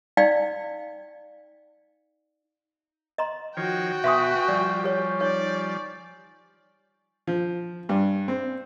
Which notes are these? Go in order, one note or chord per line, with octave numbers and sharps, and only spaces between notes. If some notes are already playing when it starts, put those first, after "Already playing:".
D#4 D5 F5 G5
D#5 A#5 C6
D#3 F3 F#4 C#5 G5
B2 B4 E5 G#5 C6 C#6 D#6
F3 G3 D5
G4 C#5
D#4 C#5 D5
F3
G2
C4